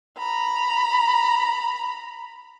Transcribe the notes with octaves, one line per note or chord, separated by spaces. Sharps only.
A#5 B5